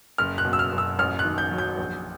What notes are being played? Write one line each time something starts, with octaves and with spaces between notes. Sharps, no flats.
F#1 F6
F#6
B2
E6
F6
F#1
E6
A1 F6
F#6
D#3
G6
F#3
G6
A#1